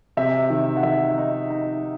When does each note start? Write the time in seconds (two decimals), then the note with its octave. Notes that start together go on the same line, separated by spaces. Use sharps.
0.17 C3 E5
0.50 D#3
0.77 F#5
0.83 D#3 E5
1.17 D#4
1.50 D#4